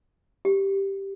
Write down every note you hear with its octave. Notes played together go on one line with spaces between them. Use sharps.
G4